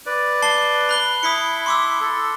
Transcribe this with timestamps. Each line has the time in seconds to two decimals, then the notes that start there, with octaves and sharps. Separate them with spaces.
0.06 B4 D5
0.42 A5 C7 G7
0.89 B5 F#6 G7
1.23 E4 D#6 B6 C#7
1.66 C6 D6 E6
2.01 A4